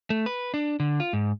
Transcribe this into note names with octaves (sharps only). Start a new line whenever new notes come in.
A3
B4
D4
D3
F4
G#2